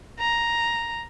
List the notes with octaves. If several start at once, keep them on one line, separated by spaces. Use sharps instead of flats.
A#5